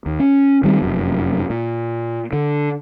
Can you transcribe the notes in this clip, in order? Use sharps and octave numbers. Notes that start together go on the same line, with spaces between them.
D#2
C#4
D#3 G3 C4
F1 F#2
A#2
D3